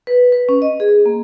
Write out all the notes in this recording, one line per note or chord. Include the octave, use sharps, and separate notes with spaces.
B4
B4
C#4
D#5
G#4
A#3